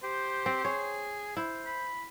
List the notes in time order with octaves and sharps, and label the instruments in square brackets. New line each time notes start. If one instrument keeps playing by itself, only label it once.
[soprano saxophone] G4 [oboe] C5
[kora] C4
[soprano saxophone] G#4 [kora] C#5
[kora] E4 [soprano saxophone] C5
[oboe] B5